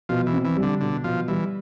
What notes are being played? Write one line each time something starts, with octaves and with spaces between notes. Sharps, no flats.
B2 F3
E3
C4
E3
G3
D3
B2 D3
B2 F3
E3 G3